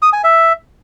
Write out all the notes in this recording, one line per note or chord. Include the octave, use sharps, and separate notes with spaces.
D#6
G#5
E5